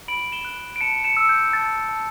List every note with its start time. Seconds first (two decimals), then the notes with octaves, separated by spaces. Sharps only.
0.08 B5 D7 F#7
0.32 E7 G7
0.45 F#6
0.76 D7
0.81 A5 C#7 E7
1.04 C#7 E7
1.17 E6
1.29 G6
1.53 A5 A6
1.89 A5